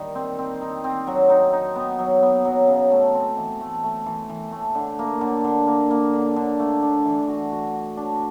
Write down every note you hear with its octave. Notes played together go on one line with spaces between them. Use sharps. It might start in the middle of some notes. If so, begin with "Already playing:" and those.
Already playing: D#3 G3 D#4
C4
C4
D#4
C4
F#3
D#4
D#4
B3
F#3
B3
F#3
C#3
A3
C4
E3
A3
A3
E3
E3
A3
D3
A#3
D3
D3
A#3
A#3
D3
D3
A3
D4
E3
F#4
F#4
F#4
D4